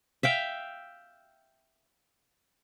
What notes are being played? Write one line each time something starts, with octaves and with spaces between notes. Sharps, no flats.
E5 F5 G5